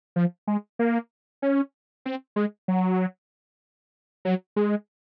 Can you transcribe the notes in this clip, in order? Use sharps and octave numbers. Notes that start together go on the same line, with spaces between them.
F3
G#3
A#3
C#4
C4
G#3
F#3
F#3
G#3